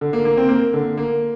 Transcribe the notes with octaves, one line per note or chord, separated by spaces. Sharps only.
D3
A#3
A#3
C4
A#3
D3
A#3